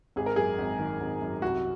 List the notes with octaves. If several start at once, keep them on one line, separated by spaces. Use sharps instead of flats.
G#1 G#4
A#4
F#2 G#4
G#1
D#3
G#1
F#2
C2 F#4